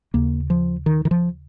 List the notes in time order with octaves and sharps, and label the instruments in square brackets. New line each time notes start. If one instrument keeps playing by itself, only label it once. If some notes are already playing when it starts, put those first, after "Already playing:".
[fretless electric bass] D#2 C#3 A#3
F3
D#3
D#3
F3